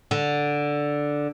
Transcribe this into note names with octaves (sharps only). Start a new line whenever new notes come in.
D3